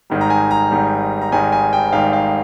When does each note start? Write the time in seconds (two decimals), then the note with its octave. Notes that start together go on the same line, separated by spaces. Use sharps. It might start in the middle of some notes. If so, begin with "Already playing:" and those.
0.10 G#1 G#2 D#3 G3
0.21 A#5
0.30 G#5
0.51 A#5
0.71 G#1 G#2 D#3 G3
1.22 A#5
1.32 G#1 G#2 D#3 G3 G#5
1.52 G#5
1.73 G5
1.93 G#1 G#2 D#3 G3 F5
2.13 F5